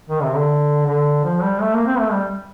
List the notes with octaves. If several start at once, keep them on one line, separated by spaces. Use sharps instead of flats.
D#3
C3
D3
D3
F3
G3
A3
A#3
C4
A3
G3